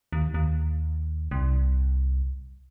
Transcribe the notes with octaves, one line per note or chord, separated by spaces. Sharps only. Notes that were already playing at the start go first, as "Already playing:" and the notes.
D#2
D#2
C2